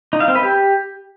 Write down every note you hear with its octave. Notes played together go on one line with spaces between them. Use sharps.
D#4
F5
C4
B4
G4